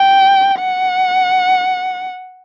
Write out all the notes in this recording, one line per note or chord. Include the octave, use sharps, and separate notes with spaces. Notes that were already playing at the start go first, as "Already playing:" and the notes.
Already playing: G5
F#5